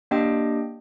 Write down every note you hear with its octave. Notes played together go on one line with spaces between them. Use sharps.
A#3 D4 G4 D#5 G5